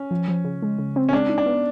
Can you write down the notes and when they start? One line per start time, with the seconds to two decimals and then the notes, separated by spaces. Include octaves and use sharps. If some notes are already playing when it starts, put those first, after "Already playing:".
Already playing: C#4
0.11 F3
0.28 F3
0.45 C#3
0.62 G#3
0.79 C#3
0.96 C4
1.09 C#4
1.13 G#3 D4
1.29 D#4
1.38 D4
1.46 B3